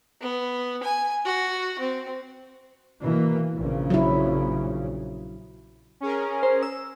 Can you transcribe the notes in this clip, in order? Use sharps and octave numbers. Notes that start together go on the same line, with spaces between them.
B3
G#5
F#4
C4
B2 E3 A#3
A#1 A#2 C#3
F#3 E4
C#4 G#4 A#4
C5
E6